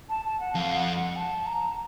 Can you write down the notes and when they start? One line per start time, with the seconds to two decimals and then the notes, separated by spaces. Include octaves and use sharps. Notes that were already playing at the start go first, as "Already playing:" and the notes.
0.09 A5
0.25 A5
0.40 F#5
0.55 F2 F5
0.76 F#5
0.95 F#5
1.16 A5
1.46 A#5